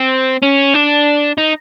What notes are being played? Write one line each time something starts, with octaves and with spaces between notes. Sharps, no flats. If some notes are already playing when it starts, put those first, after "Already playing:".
Already playing: C4
C#4
D4
D#4